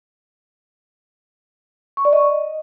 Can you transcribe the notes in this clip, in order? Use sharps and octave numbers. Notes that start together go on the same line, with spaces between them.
C#6
D5
D#5